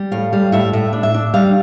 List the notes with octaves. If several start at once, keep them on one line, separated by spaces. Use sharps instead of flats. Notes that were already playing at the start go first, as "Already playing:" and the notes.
Already playing: G3
A2 F5
G3 F5
A2 E5
A2 E5
D4
E5
D4
G3 F5